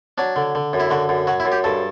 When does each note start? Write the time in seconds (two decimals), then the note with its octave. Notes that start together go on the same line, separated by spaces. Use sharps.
0.18 F#3 D4
0.36 D3
0.55 D3
0.73 F#2
0.80 E4
0.90 D3 F#4
1.09 F#2
1.27 F#3 F#4
1.40 E4
1.45 F#2
1.52 G4
1.64 G2 A4